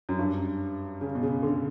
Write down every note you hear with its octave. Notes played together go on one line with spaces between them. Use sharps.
F#2
G2
C#3
B2
C#3
D3